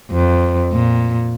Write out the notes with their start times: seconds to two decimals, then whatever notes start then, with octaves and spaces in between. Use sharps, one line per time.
0.11 F2
0.72 A#2